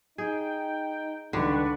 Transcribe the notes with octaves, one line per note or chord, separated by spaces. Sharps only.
D#4 G#4 G5
C#2 G2 D3 D#3 D4 B4 C#6